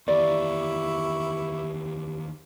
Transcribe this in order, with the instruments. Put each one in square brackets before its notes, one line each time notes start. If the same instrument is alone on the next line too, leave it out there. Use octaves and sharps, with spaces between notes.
[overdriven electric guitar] D#2 E3 [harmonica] E4 C#6 [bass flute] G4 [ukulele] D5